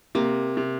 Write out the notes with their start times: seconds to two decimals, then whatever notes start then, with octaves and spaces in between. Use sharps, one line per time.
0.15 C3 A#3
0.57 C3